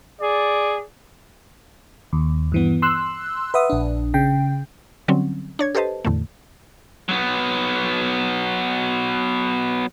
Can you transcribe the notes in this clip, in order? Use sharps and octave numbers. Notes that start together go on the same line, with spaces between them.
G#4 D5
D#2
G2 E3 B3
C6 E6 F#6
B4 E5 F#5 D#6
A#1 D4
C#3 G5
D3 F#3 G3 C4 C#4
D4 C#5 G#6
G4 A4 B4 C5 D#5 A5
E2 A2 D3 A3
F#3 B3